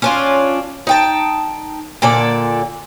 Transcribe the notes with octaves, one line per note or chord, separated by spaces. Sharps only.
C#4 D4 F4
D#4 G5 A5
A#2 D3 A4 D5